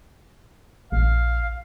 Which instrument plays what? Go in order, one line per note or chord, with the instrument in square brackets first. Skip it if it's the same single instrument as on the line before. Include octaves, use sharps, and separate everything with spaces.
[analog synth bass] A#1 [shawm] F5